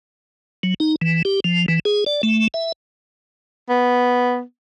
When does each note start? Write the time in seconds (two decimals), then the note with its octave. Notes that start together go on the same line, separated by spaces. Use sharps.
0.63 F#3
0.80 D#4
1.01 E3
1.25 G4
1.44 F3
1.68 E3
1.85 G#4
2.06 D5
2.23 A3
2.54 E5
3.70 B3